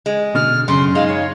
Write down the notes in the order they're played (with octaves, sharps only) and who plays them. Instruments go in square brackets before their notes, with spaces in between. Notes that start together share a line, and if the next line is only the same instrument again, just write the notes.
[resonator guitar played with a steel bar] G#3
[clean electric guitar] B2 D3 [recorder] F6
[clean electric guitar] F#2 [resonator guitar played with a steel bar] C#3 [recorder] C6
[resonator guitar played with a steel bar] G#3 [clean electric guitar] D#4 [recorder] F5
[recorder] C#5